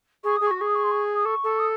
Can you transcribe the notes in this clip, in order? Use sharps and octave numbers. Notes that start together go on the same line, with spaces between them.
G#4 C#6
D#6
G#4
C#6
F#4
C#6
G#4 D#6
C#6
C6
C#6
D#6
A4 C#6
A4
D#6